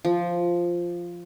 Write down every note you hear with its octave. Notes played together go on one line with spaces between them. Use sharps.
F3